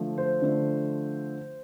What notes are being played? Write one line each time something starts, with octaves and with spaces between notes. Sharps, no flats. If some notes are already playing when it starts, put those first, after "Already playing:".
Already playing: D3 F3 A3
C5
D3 F3 A3